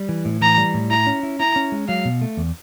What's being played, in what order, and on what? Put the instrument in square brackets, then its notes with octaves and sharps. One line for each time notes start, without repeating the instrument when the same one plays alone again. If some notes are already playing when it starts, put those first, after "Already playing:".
Already playing: [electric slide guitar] G3
E3
A2
[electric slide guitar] E3 [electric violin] A#5
[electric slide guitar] G3
A2
[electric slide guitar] E4 [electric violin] A#5
[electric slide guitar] C#4
E4
[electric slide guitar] E4 [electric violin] A#5
[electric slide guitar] C#4
G#3
[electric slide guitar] F#3 [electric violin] F5
[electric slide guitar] B2
A3
E2